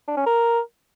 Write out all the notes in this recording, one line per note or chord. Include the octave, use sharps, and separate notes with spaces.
D4
C#4
A#4